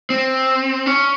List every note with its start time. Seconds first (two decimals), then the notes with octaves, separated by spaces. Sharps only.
0.10 C4
0.86 C#4